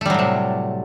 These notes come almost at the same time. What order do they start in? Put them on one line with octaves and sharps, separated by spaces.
A3 G3 F#3 A2 C3